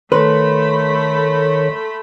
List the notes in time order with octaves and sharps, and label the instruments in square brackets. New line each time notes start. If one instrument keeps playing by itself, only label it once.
[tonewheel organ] D#3 A#4 C#5 [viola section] A3 B5 [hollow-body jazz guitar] B4 [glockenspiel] C6